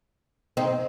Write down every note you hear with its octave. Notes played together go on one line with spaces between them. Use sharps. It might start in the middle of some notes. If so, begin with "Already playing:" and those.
C4 D#4